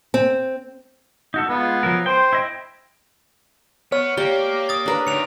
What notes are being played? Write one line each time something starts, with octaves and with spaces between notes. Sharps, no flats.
C4
D#4 F#4 A4
G#3 B3 F4
F3 F#3 A#4
C5 G5 C6
E4 D#5 G5
B3 C#5 F6
A#3 G4 D5 G7
D#6 A6
D4 A#4 B4
D2 D#3 C#7 F7